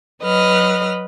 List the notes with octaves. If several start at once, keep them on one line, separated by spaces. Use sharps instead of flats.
F#3 B4 D#5 F6